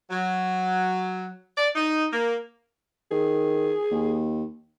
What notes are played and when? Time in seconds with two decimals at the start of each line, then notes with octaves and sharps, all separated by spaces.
0.10 F#3
1.57 D5
1.75 D#4
2.13 A#3
3.11 D#3 G#4
3.91 D#2